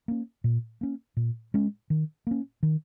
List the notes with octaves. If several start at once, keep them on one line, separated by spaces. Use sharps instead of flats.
A#3 C#4
A#2
A#3 C#4
A#2
G#3 C#4
D#3
A#3 C#4
D#3